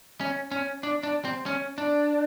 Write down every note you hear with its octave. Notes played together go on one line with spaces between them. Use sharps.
C#4
C#4
D4
D4
C4
C#4
D4